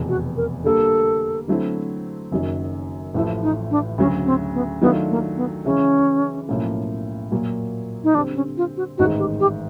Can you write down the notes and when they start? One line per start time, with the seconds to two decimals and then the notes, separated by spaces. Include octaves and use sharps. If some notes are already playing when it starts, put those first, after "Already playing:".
Already playing: F1 E2 B2
0.09 F#4
0.37 A#4
0.64 D3 G3 A#3 A4
1.48 D3 F#3 A3 C4 E4
2.32 F#1 F#2 D#3 F#3
3.14 A1 A2 F3 A3 E4
3.43 D#4
3.71 D4
3.98 D2 C#3 F#3 C#4
4.26 C4
4.54 B3
4.82 D#3 F#3 A3 B3 D4 F4
5.10 A#3
5.36 B3
5.64 C#3 E3 G#3 C#4
6.48 B1 A2 F3 A#3 C#4
7.32 A#2 F#3 A#3
8.04 D#4
8.14 D3 G3 C4 D4
8.35 C#4
8.57 F4
8.77 F#4
8.98 A1 G#2 D#3 G#3 F#4
9.19 G4
9.40 G4